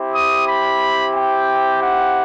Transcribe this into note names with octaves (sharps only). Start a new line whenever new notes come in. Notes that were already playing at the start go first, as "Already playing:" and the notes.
Already playing: C4 E4 G4
D#6
B5
G5
F#5